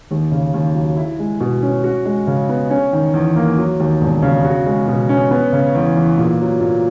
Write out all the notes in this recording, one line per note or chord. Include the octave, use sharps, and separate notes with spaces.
D#2
C#3
D#2
F#3
E4
G#3
B2
C#4
F#4
G#3
C#3
B3
C#4
D#3
E2
A#3
F#3
D#2
E1
C#3
F#4
G#3
B2
C#4
B3
C#3
E2
E3
A#2
F#3
A#2